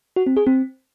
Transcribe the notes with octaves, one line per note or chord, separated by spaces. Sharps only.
F#4
C4
G#4
C4